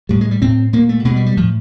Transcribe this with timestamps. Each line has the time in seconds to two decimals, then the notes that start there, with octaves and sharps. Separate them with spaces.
0.09 A2 G3
0.21 G#3
0.31 G3
0.42 A2 C4
0.73 A#2 A#3
0.89 A3
1.05 B2 G#3
1.16 G3
1.26 G3
1.37 A2 F3